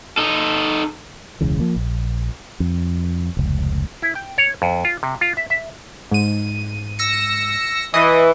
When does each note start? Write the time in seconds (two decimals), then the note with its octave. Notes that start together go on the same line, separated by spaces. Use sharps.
0.18 D#4 A4
1.41 E1 C#2 C#3 E3
1.60 F3 A#3
1.76 A#1
2.60 F2
3.37 F1 C#2
4.02 E4
4.15 G5
4.38 C#5
4.62 F2
4.85 F4
5.03 C3
5.21 F4
5.37 E5
5.50 E5
6.11 G#2 D#7
6.99 E6 A#6 C#7
7.94 E3 D#5 D#6